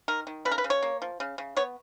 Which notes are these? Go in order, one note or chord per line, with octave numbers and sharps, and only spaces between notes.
D#3 A#4
D#3
C#3 B4
A#4
B4
C#3
C#5
A#3
F3
C#3
C#3
B3 C#5